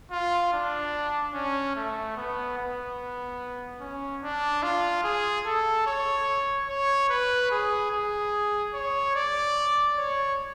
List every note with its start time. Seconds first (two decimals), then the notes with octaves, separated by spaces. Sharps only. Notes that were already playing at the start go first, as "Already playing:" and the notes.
0.11 F4
0.53 D4
1.34 C#4
1.76 A3
2.17 B3
2.58 B3
3.81 C#4
4.23 D4
4.63 F4
5.04 G#4
5.46 A4
5.87 C#5
6.69 C#5
7.10 B4
7.51 G#4
7.91 G#4
8.74 C#5
9.16 D5
9.97 C#5